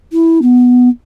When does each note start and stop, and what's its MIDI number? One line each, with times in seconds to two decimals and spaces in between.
0.13 0.39 64
0.42 0.88 59